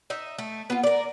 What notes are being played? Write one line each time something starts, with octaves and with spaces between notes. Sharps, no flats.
D#4 E5
A3
B3 F4
A#4 D5